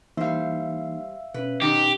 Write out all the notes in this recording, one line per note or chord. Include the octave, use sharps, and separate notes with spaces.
E3 G3 A#3 D#4 C5 E5 F5
B2 C#4 B4
D#3 B3 D#4 G4